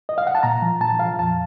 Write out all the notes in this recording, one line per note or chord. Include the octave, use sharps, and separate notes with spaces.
D#5
F5
F#5
A5
A#2 A#5
F3
A#2 A5
F3 F5
F2 A5